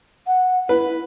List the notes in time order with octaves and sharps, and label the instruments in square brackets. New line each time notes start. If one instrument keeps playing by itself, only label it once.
[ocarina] F#5
[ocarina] E4 [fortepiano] B4